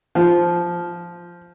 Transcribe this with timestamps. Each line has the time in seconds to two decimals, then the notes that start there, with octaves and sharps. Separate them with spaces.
0.15 F3